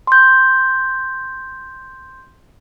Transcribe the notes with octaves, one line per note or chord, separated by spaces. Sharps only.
C6 G6